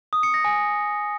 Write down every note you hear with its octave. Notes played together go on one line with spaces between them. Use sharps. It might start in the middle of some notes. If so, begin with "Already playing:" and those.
D#6
C#7
A#6
G#5